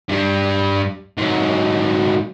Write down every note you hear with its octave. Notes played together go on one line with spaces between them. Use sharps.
G2 G3
G#2 F#3